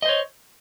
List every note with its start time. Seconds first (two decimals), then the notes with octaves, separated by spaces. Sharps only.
0.02 D#5
0.06 C5
0.09 C#5